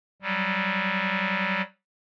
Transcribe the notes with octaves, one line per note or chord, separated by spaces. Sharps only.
F#3 G3